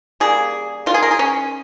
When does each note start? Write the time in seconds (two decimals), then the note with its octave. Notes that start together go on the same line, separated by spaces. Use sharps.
0.20 C#3 G3 A#3 G#4
0.86 D#3 F4
0.90 G#3 G#4
1.03 A#4
1.11 G#4
1.19 C#4